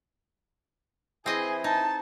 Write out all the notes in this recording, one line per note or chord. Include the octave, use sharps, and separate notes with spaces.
E3 C4 E4 G#4 D#5 G#5
D#4 A5